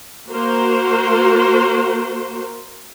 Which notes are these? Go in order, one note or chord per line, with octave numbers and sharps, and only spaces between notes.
A#3 F#4 A#4 C5